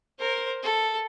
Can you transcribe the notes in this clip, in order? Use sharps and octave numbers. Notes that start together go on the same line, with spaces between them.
A#4 C5
A4